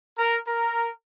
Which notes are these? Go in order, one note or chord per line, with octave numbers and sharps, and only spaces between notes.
A#4
A#4